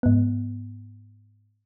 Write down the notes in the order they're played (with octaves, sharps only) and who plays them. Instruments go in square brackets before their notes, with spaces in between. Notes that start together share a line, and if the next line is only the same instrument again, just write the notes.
[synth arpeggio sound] G#2 B3